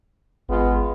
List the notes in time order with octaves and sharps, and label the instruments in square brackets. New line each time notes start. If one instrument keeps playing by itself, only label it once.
[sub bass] G#1 [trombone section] G#3 B3 F4